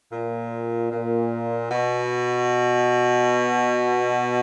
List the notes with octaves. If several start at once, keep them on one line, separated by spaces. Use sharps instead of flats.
A#2
A#2
B2